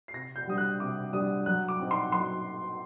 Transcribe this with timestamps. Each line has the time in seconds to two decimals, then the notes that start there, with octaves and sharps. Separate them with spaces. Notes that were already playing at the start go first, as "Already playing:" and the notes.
0.08 C7
0.14 C3 A#6
0.36 G6
0.47 G3 D4 D#6
0.58 F#6
0.80 C3 D6
1.13 G3 D4 D#6
1.46 F#3 F#6
1.69 D6
1.80 C4 D#4
1.91 C6
2.12 F#3 C6